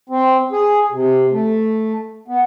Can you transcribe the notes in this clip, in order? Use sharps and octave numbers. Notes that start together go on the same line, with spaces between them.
C4
G#4
C3
A3
B3